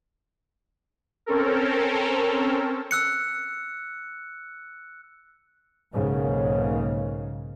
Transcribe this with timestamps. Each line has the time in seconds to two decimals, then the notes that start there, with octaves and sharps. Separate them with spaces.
1.26 C4 C#4 A4 A#4
2.91 E6 F#6 C#7
5.93 B1 G#2 C#3 A#3